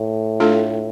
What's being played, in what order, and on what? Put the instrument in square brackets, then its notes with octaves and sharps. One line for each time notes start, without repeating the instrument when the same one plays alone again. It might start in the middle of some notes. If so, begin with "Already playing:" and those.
Already playing: [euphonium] A2
[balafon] A3 D4 F4 A4